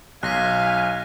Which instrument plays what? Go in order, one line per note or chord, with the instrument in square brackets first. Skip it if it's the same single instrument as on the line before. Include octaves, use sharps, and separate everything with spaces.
[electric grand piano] B1 [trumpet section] F5 [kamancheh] G#5 [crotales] F#6 A#6 B6